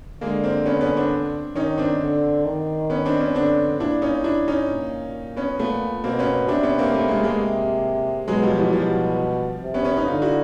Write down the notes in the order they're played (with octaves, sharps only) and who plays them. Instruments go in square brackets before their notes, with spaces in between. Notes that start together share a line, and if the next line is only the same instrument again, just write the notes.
[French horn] D3 [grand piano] G#3 A#3
[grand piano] A#3 C4
B3 C#4
B3 C#4
C4 D4
[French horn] D#3 [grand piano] C#4 D#4
[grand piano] C4 D4
[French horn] D3
D#3
[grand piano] B3 C#4
C4 D4
B3 C#4
[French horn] D3 [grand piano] C4 D4
[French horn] A#2 [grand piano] D4 E4
[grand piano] C#4 D#4
D4 E4
C#4 D#4
[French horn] A#2
[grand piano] B3 C#4
[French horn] A#2 [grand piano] A3 B3
[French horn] B2 [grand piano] A#3 C4
[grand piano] B3 C#4
[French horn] C3 [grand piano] C4 D4
[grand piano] B3 C#4
A#3 C4
A3 B3
G#3 A#3
G#3 A#3
[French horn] C3
[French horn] B2 [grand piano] F#3 G#3
[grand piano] F3 G3
E3 F#3
[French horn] B2 [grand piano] F3 G3
[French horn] C3
[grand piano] B3 C#4
B3 C#4
C#4 D#4
[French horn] D3 [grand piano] D#4 F4
[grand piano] E4 F#4